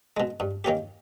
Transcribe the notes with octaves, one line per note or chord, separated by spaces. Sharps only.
B2 G#3
G2
D#3 A#3 C#4 G4